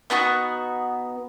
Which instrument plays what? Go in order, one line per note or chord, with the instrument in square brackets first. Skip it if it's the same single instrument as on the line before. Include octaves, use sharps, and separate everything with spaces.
[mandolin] B3 D#4 F#4 C#6